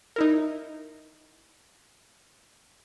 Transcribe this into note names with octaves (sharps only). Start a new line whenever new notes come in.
D#4 E4 A#4